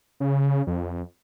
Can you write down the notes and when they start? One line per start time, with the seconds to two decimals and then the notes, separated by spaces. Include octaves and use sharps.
0.20 C#3
0.67 F2